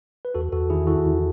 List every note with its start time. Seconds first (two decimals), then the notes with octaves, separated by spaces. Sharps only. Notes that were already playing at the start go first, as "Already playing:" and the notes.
0.25 B4
0.34 E2 F#4 A4
0.52 E2 F#4 A4
0.70 D#3 E4 G#4
0.87 E4 F#4 A4
1.06 E2